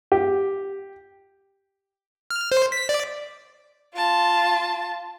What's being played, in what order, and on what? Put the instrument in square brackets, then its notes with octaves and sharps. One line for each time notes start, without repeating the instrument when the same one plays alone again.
[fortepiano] G4
[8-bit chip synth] F6
C5
B6
D5
[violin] F4 A5